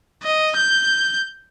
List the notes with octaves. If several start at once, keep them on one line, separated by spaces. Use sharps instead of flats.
D#5
G6